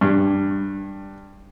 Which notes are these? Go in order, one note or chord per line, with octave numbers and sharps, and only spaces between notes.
G2